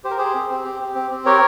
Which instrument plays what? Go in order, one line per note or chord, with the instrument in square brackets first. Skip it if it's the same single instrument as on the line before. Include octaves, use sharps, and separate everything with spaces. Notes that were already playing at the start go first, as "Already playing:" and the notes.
[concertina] G4 C5
A#4
G4 G#4 C5
C4
C4
G4
G4
C4
C4
G4 A#4 C#5